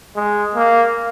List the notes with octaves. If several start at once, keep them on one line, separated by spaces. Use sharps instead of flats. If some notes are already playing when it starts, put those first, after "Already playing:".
G#3
A#3